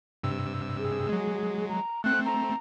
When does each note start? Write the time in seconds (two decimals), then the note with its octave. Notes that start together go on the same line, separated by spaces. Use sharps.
0.23 G2 C3 E6
0.79 G#4
1.09 F#3 G#3
1.69 A#5
2.04 A3 C4 F#6
2.26 A#5